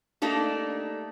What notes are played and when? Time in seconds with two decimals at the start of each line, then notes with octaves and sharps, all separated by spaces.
0.22 A3 A#3 D4 D#4 G4